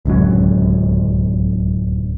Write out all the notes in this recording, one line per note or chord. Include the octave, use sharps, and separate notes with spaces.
D1 C#2 F#2 F#3